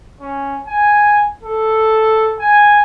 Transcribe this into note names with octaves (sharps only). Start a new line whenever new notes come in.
C#4
G#5
A4
G#5